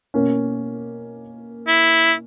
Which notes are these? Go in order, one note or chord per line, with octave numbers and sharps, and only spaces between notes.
B2 A#3 C#4
E4